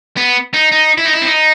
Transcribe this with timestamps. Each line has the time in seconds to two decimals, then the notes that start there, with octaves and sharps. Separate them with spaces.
0.17 B3
0.54 D#4
0.72 D#4
0.98 E4
1.06 D#4
1.14 E4
1.22 C4
1.27 D#4